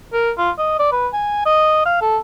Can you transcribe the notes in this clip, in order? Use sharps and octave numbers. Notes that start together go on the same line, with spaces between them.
A#4
F4
D#5
D5
B4
G#5
D#5
F5
A4